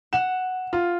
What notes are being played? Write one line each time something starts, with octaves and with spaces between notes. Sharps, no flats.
F#5 E7
F4